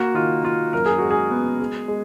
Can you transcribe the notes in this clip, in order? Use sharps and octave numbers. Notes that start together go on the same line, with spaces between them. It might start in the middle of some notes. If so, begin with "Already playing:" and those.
Already playing: A#3 F#4
D#3 F4
A#3 F4
F#2 A#4
G#4
G#3 F#4
G#4
B3
G#3
G#3